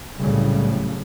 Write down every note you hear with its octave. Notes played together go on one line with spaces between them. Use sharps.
C2 A2 C#3 F#3 G3